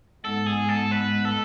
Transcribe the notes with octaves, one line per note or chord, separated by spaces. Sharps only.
G#2 G#3 B3 A4
G#4
A4
B4
A4